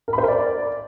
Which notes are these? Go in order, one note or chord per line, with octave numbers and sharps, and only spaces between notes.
A#4
B5
C5
A#4
D5